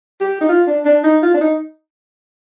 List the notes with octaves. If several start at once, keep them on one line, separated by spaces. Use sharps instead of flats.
G4
D#4
F4
D4
D4
D#4
F4
D4
D#4